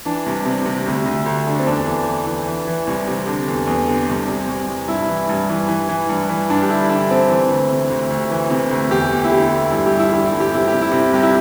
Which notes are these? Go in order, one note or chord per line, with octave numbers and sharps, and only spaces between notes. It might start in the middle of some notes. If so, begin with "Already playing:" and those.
E3 D4
C2
C3
C3
D2
D2
D2
D3
C4
E2 D4
E3
E3
E3
E3
E3
C2
C3
D3
E2
E2
D3
C2
C3
C2
C2
G2 E4
E3
G2
E3
E3
E3
G2
E3
G2 D4
G4
D3 E4
D3 D4
D3 C4
E3
D2
C3
D2
D2
E3
C3
D2
E2 G4
E2
E4
D3 G4
E2
G2 E4
G4
G2
E4
D3 G4
E4
G2
G4
C3 E4
C3 G4
E4
C3
C2 G4
E4